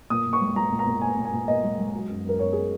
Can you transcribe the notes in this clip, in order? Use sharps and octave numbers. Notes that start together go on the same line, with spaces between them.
A#2 D#6
A#2
C#6
G#3
G#3 A#5
A#2
A#5
A#2
A#2 G#5
A#2
G#5
A#2
A#2 D#5
G#3
G#3
F#3
F#2
F#2 A#4
F#2 C#5
G#4